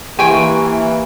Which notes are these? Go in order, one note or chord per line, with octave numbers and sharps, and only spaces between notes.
E3 A#3 G4 G5 G#5 C6 C#6